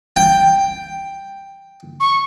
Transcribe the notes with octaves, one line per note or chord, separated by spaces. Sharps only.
G5
C#6